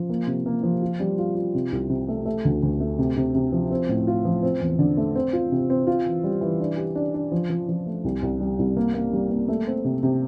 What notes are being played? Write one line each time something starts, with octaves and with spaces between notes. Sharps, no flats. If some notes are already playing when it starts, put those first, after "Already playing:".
Already playing: F3
A#3
C3
A#3
F3
F4
G3
F4
F4
C3
C2
C3
A3
A3
D2
D2
A3
C3
C3
C3
F3
C4
A2
F4
F3
C4
E2
D3
A3
C4
F4
C3
C4
F4
E3
G3
E3
D4
G4
D4
D4
F3
F3
F3
A3
C2
C2
G3
C2
A#3
A#3
G3
A#3
A3
C4
C3
C3